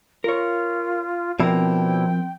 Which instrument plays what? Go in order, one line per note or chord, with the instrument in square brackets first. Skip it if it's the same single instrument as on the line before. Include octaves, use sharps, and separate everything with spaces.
[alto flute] F4 [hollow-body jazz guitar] A#4 C#5
[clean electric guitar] B2 D4 E4 [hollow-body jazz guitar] F3 A#4 [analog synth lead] C4 [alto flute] G5